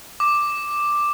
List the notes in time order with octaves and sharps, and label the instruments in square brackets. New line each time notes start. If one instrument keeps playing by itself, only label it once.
[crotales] D6